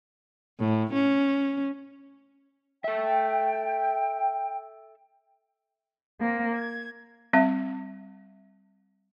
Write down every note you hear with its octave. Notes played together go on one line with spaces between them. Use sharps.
A2
C#4
A4 E5 G5
A#3 C4
G#6
G3 C4 E5